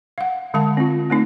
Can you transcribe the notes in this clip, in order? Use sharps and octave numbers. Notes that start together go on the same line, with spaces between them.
F5 F#5
D3 G#3 F5 A5
C4 F4
A3 C4 D#4